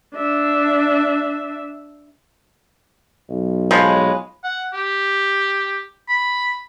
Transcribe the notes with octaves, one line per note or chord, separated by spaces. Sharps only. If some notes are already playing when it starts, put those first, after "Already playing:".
D4 E5
B1
F3 G#3 B4 C#5 G#5
F#5
G4
B5